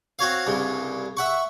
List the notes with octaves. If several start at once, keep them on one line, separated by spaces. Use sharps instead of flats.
C4 F#4 C#5 F5
C2 G2 C#3
E5 F#5 C#6